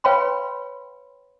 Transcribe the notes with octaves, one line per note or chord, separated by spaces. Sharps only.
B4 C#5 F5 G5 B5 C6